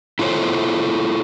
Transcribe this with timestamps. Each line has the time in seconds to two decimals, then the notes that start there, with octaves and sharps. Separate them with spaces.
0.19 E4 F4 A4 C5 C#5